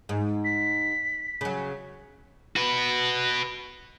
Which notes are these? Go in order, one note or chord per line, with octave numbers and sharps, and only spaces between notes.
G#2
B6
C#3 F#3
F#4 B4